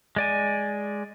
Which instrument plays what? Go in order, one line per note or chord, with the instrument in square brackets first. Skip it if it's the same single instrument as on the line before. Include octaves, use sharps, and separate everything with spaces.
[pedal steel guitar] G#3 D5 G#5